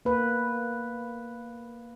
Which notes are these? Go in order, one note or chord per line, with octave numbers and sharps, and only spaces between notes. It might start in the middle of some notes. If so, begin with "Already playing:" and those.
A#3 B4